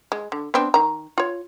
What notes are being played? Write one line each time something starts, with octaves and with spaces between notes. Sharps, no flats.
G#3
D3
B3 C4 D4
D#3 A#5
F4 C#5